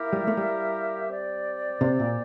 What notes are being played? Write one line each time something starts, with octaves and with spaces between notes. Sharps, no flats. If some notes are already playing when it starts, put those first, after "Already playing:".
Already playing: A#3 E4 G4 A#4 E5
G3
A3
G3
C4 G4 D5
C3
A#2